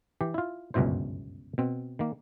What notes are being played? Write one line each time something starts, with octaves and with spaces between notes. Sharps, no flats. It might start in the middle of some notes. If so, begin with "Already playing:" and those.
E3 G4
E4 F4
G1 C#2 F#2 B2 E4 C5
B2 C4
D#3 A#3